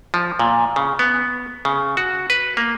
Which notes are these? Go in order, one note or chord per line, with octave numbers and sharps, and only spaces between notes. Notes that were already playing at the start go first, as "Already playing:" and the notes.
F3
A#2
C#3
B3
C#3
F#4
B4
A#3